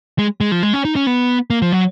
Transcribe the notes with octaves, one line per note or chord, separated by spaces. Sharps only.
G#3
G#3
F3
G#3
C#4
D#4
C#4
B3
A#3
F3
F#3